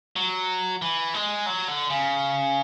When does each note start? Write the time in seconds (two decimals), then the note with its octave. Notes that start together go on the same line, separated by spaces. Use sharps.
0.16 F#3
0.82 E3
1.14 G#3
1.46 F#3
1.68 D3
1.90 C#3